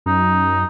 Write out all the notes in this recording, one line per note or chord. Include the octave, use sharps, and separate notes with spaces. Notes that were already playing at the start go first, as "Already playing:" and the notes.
F#2 D#4